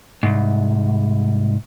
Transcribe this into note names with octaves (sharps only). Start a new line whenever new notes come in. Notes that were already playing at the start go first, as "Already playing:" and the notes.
C2 G#2